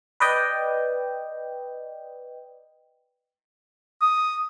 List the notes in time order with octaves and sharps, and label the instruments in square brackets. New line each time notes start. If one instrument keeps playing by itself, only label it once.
[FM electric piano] B4 D5 D#5 G5
[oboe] D#6